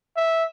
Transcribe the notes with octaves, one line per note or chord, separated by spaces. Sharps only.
E5